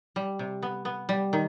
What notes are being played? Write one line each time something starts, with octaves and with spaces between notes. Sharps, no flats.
G3
C3
B3
B3
G3
D#3